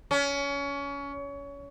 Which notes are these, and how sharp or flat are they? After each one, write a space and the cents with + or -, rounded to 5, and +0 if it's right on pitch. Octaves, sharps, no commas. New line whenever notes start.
C#4 +25